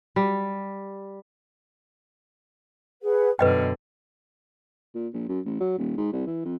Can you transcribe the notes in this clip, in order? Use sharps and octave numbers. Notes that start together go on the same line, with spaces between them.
G3
G#4 B4 F#5
F#2 B2 D3 B4 D#5 G5 F6
A#2
A#1
F#2
A1
F#3
D#1
G#2
C2
E3
F2